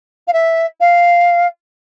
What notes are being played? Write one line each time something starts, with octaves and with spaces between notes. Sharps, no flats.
F5
E5
F5